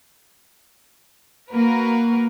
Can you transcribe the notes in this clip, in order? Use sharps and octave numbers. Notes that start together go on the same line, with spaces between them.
A#3 F#4 A#4 B4